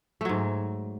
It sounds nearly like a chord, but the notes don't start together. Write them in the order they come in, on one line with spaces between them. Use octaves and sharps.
A3 F#3 G#2